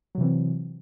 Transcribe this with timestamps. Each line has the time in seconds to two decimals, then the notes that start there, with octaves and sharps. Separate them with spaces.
0.15 F#3
0.18 C3
0.21 E3
0.24 C4